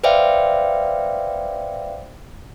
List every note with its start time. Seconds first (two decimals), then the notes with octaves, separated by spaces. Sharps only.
0.04 B4 C5 D5 E5 F5 G5